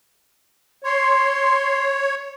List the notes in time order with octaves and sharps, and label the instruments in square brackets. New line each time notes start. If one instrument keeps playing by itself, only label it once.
[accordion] C#5 [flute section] C6